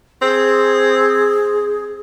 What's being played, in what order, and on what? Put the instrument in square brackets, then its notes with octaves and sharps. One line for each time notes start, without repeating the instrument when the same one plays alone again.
[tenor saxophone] C4 [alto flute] G#4